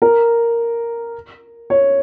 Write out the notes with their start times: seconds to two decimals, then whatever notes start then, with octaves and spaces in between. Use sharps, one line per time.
0.02 A#4
1.70 C#5